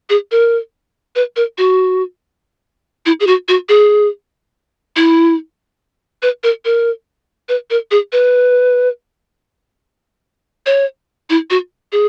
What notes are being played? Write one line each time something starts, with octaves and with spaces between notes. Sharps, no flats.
G#4
A#4
B4
A#4
F#4
E4
G#4
F#4
F#4
G#4
E4
B4
A#4
A#4
B4
A#4
G#4
B4
C#5
E4
F#4
G#4